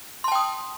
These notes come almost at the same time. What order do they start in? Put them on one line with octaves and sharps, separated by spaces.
C6 A5 G5 D#6